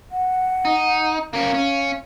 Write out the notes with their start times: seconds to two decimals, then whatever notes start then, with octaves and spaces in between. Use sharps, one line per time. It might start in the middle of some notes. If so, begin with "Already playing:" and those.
0.11 F#5
0.65 D#4
1.33 A#3 C#4 F5
1.54 C#4